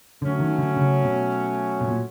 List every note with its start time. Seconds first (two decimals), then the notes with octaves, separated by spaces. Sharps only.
0.22 D3 F#3 A3 C#4
0.40 D#3
0.59 D3
0.77 C#3
1.04 B2
1.81 B2
1.88 A#2